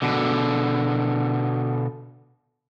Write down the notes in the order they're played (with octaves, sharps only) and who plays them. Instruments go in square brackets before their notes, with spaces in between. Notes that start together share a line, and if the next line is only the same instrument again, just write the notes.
[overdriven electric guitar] B2 D3